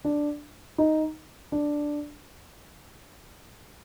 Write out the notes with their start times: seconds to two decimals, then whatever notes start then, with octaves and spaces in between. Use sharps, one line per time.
0.05 D4
0.78 D#4
1.52 D4